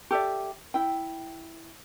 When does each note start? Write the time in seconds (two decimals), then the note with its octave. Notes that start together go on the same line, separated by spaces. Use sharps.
0.11 G4 A4 D5 E5
0.74 E4 G5